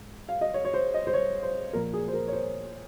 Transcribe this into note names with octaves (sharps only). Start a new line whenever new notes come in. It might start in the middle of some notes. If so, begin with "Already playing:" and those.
Already playing: G#2
F5
D#5
C#5
C#5
C5
D#5
C5
C#5
C5
A#2 F3 A#4
G#4
C5
A#4
C#5
C5